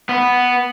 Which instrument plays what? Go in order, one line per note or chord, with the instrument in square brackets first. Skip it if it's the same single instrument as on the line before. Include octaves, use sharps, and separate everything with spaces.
[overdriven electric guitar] B3